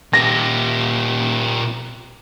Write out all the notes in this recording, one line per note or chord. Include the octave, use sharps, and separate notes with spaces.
A#2 G4 A#6